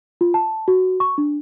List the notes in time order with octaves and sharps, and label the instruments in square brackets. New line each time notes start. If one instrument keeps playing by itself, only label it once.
[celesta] F4
A5
F#4
C#6
D4